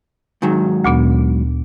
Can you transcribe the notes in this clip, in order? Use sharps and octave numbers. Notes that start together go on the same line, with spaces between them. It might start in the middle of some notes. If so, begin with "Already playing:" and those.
G#2 D#3 F#3
D2 A#2 B3